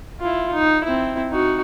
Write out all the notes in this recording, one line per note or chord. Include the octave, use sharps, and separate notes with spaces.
E4 F4
D#4
C4 E4
D#4 F#4